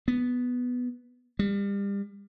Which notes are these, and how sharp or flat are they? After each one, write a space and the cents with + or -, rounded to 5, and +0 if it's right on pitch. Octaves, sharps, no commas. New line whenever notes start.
B3 +0
G3 +35